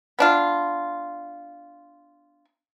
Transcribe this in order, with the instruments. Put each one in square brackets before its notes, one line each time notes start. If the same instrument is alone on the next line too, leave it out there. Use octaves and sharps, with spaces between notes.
[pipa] B3 D4 F4